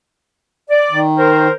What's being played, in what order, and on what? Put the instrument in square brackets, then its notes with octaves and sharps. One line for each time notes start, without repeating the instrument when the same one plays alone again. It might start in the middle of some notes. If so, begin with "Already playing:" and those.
[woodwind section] D5
[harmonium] D#3
[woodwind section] A#4 C5